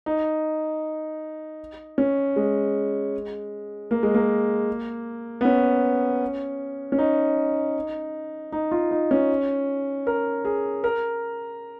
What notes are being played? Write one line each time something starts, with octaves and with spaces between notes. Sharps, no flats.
D#4
C#4
G#3
A#3
G#3
A#3
B3
C#4
C#4
D#4
D#4
F4
D#4
C#4
A#4
G#4
A#4